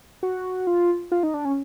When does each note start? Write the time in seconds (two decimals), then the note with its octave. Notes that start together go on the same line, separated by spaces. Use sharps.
0.23 F#4
0.67 F4
1.12 F4
1.23 D#4
1.34 D4
1.45 C#4